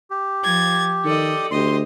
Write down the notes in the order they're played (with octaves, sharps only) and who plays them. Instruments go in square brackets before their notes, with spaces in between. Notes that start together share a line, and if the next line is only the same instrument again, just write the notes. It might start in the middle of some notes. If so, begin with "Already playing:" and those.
[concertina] G4
[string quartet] F3 G#6 A6
[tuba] D#3 [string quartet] A4 D5 D#5
[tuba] D2 [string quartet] G4 D#5 [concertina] C6